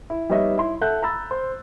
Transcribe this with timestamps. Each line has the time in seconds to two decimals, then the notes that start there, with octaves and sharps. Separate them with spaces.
0.10 E4
0.30 G3 B3 D#4 C#5 D#5 E5
0.58 E4 C6
0.81 A4 E5 F#5 F#6 G6
1.02 A#5 B5 E6 A6
1.31 C5